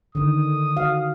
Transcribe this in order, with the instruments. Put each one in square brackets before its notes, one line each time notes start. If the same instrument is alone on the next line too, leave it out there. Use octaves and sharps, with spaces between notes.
[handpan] D3 D#3 [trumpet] D#6
[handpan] F#4 F5